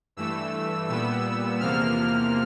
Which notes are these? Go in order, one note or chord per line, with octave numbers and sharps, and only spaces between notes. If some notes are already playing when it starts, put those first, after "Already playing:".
G2 E3 A3 E6
A#2 G3 B3 E6
E2 C3 F3 A#3 F6